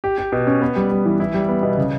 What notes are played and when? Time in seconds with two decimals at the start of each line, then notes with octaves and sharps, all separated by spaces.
0.04 G4
0.18 G4
0.32 B2
0.47 C#4
0.61 B3
0.76 G3
0.91 G3
1.06 E3
1.20 E4
1.34 G3
1.49 B3
1.63 B2
1.78 C#3